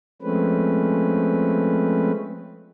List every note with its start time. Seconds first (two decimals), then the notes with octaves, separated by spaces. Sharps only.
0.22 F3 G#3 A3 C4 C#4 B4